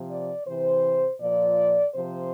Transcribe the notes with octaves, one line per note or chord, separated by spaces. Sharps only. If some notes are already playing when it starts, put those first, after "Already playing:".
Already playing: C3 F3
D5
C3 E3 C5
A#2 F3 D5
C3 F3 C5